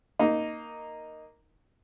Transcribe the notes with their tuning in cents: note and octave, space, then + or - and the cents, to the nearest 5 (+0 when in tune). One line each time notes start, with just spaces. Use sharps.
A#3 +0 D#4 +0